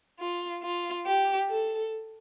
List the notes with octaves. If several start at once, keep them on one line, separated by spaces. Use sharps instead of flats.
F4
F4
G4
A4